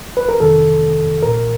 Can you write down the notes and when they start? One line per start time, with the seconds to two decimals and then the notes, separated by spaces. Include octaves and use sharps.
0.17 B4
0.29 A#4
0.40 F2 C3 D#3 A4
1.22 C2 A#2 A#4